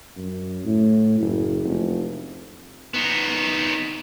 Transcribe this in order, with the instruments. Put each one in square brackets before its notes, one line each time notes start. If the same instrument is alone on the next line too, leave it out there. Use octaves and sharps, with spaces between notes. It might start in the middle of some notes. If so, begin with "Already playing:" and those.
[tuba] F#2
A2
F#1
F1
[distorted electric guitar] D#3 B3